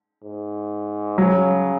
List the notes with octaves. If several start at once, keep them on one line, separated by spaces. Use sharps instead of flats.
G#2
C#3 F#3